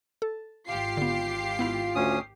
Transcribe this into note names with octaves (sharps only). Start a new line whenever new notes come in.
A4
G#1 F4 G4 C7
D3 B3
B3 E4 F5
D2 C#4 D#6